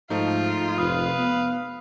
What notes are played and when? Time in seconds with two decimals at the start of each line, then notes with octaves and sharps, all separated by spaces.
0.10 G#2 F3 A3 D#4 F4
0.78 F1 B4 F5 D#6
1.18 B3